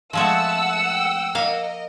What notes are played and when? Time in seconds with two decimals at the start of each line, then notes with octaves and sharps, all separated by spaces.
0.13 F3 G#3 A3 E5 F#5 A5 E6
0.88 G5
1.35 A#3 A#4 D#5 F5